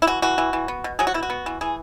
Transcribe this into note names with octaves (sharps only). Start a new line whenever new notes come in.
E4
E3 F#4
E3 F#4
E3
E3
B3
B2
F#3 G#4
F#4
B2 E4
F#4
B3
E3
E3 G#4